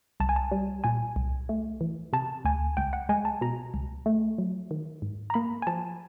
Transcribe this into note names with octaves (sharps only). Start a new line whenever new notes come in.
C2 A5
G#5
A5
G3
A#2 G#5
C2
A3
E3
C3 A5
D2 G#5
C#2 G5
F#5
G#3 G#5
A5
B2 A#5
C#2
A3
F#3
D#3
G#2
A#5
A#3 B5
G#5
F3 A5